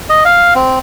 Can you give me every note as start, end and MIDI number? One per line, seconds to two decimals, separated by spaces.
0.10 0.24 75
0.25 0.54 77
0.55 0.79 60